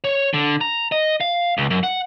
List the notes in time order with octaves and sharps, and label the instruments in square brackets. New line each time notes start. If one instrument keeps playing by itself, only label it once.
[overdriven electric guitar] C#5
D3
A#5
D#5
F5
C#2
F#2
F#5